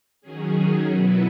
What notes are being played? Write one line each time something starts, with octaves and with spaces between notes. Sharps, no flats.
D#3 F#3 C#4 G#4
B2 F#3 B3 E4 B4